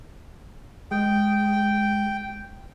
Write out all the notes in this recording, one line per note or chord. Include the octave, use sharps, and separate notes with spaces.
G#3 G5